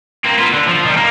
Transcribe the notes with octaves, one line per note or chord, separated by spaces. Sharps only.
A#3 C4
B3 F4
D3
F3
D#3 G3
A#3